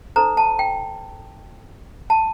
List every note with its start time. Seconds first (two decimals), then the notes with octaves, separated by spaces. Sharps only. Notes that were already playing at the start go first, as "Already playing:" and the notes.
0.16 D#4 A4 C5 A#5
0.37 A5
0.59 G5
2.10 A5